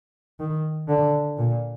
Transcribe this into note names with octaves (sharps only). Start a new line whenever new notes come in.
D#3
D3
A#2